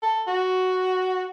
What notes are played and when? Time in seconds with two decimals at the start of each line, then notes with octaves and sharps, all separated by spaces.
0.03 A4
0.27 F#4